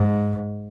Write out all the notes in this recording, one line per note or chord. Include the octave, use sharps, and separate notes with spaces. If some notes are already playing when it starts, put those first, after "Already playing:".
Already playing: G#2